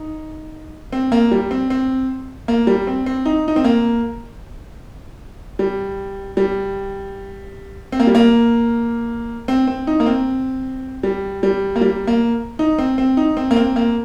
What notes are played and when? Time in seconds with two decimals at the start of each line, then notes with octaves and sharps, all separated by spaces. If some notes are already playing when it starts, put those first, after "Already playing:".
Already playing: D#4
0.92 C4
1.12 A#3
1.31 G3
1.51 C4
1.70 C4
2.48 A#3
2.67 G3
2.87 C4
3.06 C4
3.25 D#4
3.48 D#4
3.56 C4
3.64 A#3
5.59 G3
6.37 G3
7.92 C4
8.00 A#3
8.07 G3
8.15 A#3
9.48 C4
9.67 C4
9.87 D#4
10.00 A#3
10.06 C4
11.03 G3
11.43 G3
11.76 A#3
11.81 G3
12.07 A#3
12.59 D#4
12.78 C4
12.98 C4
13.17 D#4
13.37 C4
13.51 A#3
13.56 C4
13.76 A#3